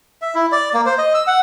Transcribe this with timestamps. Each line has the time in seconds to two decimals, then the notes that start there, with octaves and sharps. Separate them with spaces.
0.22 E5
0.35 E4
0.52 D5
0.73 A#3
0.86 C5
0.98 D#5
1.14 E6
1.27 F#5